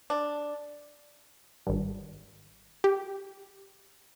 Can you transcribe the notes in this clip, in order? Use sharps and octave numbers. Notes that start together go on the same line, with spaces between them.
D4
G#1 G2
G4